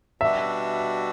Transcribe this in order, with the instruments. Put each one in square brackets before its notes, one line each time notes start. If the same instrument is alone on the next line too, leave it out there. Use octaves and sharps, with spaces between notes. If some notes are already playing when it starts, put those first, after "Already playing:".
[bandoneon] B2 G3 D4 F#4 [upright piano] E5